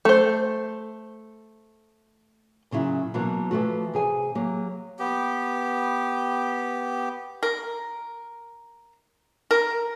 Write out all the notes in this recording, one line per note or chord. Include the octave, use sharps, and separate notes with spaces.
A3 C5
A#2 C#3 F#3 E4
B2 E3 F#3 A#3 F#4
E3 F3 A3 F#4
C3 G#4 G#5
F#3 A#3 G4
B3 G4
A#4
A#4